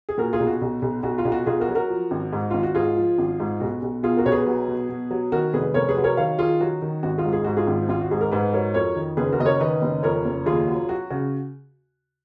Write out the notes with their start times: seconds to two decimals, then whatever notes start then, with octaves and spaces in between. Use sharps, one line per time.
0.09 G#4
0.18 A#2 F#4 A#4
0.33 F4 G#4
0.40 B1
0.47 F#4
0.62 B1
0.82 B1
1.03 B1 F#4
1.18 F4
1.25 B1
1.32 F#4
1.46 B1 F4 G#4
1.60 F#4 A#4
1.68 F#3
1.75 F#4 A#4
1.89 F3
2.11 G#1
2.33 G#2
2.50 G#1 F4
2.63 F#4
2.75 G#2 F4 G#4
2.96 F3
3.18 G#1
3.40 G#2
3.60 B1 F#4
3.82 B1
4.03 B2 F4 G#4
4.17 F#4 A#4
4.26 B1 C#5
4.32 G#4 B4
4.46 F#3
4.68 B2
4.89 B2
5.11 F#3
5.32 D#3 F#4 A#4
5.54 F1 G#4 B4
5.74 F1 A#4 C#5
5.89 G#4 B4
5.97 F#3
6.04 A#4 C#5
6.17 D#3 C#5 F5
6.39 D#3 F4 G#4
6.60 F#3 F#4
6.82 D#3
7.03 G#1 F#4
7.17 F4 G#4
7.24 G#2
7.33 G#4
7.44 G#2 F#4
7.57 F4 G#4
7.67 G#1
7.89 G#1 F4
8.01 F#4
8.11 G#2 G#4
8.21 A#4
8.31 G#2 G#4 B4
8.53 F#3 A#4 C#5
8.74 F2 A#4 C#5
8.96 D#3
9.17 F#1 G#4 B4
9.33 F#4 A#4
9.40 F#1 D#5
9.46 A#4 C#5
9.60 D#3 B4 D#5
9.82 F#1
10.03 F2 A#4 C#5
10.25 F#1
10.46 D#2 F4 G#4
10.68 F#3
10.89 F#3 F#4
11.10 C#3 F#4